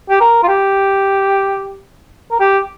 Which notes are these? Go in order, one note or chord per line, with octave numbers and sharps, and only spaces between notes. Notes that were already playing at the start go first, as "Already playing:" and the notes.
G4
A#4
F4
G4
A#4
G4